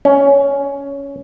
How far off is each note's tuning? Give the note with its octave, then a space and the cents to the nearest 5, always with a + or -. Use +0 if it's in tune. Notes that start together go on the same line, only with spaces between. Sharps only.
C#4 +10